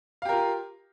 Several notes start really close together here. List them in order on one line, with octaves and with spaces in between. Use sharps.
F5 G4 A#4 F4